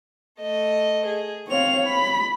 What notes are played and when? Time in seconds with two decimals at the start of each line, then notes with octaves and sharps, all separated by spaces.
0.40 A3 D#5
1.07 G#4
1.48 C4 C#5 F5 F7
1.87 B5 B6